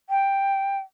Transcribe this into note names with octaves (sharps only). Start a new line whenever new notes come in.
G5